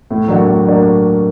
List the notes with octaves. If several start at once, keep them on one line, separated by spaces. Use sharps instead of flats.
A2
F#3 A#3 D4 F#4
A2
F#3 A#3 D4